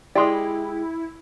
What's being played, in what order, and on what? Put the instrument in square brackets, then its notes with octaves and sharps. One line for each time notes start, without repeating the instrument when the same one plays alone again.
[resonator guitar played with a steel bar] G#3 G4 [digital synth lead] E4 [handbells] D5 C6 D#6